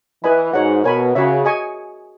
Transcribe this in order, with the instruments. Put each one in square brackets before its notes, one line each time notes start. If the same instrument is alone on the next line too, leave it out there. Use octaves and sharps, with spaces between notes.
[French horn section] E3 [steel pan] B4 D#5 G#5 B5
[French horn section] G#2 [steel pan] F#4 C#5 F#5
[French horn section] B2 [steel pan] A#4 C#5 G#5 B5
[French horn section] C#3 [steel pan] F#4 C#5 E5
[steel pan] G#4 D#5 G#5 C#6